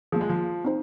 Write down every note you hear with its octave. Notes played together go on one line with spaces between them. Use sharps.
F3 A#3 F4 G#4
G#3
F3
C4 D#4 C5